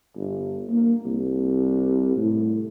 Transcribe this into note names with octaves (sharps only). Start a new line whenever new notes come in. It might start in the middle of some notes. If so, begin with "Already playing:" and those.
G1
A#3
C2
A2